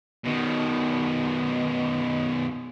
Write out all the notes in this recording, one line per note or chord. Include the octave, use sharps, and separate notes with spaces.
B2 D#3